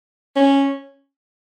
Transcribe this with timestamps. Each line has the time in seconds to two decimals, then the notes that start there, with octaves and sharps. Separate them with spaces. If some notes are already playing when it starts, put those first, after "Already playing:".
0.36 C#4